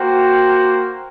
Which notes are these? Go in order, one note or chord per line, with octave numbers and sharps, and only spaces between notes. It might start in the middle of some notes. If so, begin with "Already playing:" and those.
Already playing: A#3 F#4 C5 G5